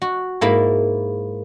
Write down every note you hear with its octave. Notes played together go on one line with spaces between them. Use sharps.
F#4
G#2 A#3 E4 B5